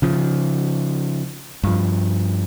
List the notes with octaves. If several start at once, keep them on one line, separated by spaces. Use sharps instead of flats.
C#3 F3
G2 F3